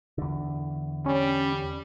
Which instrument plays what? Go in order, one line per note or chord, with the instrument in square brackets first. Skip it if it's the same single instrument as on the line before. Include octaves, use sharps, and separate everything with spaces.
[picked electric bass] E2 D3
[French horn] G3 [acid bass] C#4